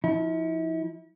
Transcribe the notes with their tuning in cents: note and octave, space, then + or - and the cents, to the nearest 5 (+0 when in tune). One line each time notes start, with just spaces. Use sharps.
F3 +0 E4 -40